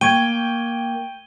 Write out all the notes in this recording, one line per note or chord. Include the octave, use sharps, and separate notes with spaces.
A#3 G5 C#6 G#6 D#7 G7